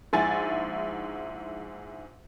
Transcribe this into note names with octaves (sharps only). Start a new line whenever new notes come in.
A#1 G#2 E4 G#5 A6